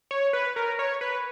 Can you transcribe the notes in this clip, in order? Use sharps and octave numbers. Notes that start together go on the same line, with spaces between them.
C#5
B4
A#4
C#5
B4